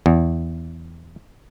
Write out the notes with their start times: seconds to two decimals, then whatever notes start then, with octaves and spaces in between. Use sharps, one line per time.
0.06 E2